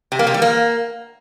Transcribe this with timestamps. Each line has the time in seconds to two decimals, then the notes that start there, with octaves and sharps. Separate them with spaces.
0.12 C3
0.19 A#3
0.27 C3
0.34 G3
0.42 A#3